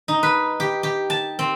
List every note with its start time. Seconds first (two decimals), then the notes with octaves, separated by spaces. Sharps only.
0.08 D#4
0.23 B4
0.60 G4
0.83 G4
1.10 A5
1.39 C4